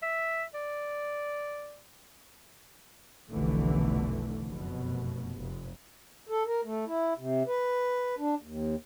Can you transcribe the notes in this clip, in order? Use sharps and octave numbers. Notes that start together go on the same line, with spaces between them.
E5
D5
F1 B1 B2 D3 E3 A3
F1 F#2 B2
F1
A4
A#4
A3
E4
C3
B4
D4
D#2